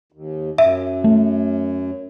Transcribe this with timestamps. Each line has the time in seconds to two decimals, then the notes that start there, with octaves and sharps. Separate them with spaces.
0.12 D#2
0.58 F#2 E5
1.04 A3